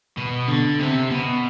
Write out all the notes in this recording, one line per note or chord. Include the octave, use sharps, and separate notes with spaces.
B2
D3
C3
B2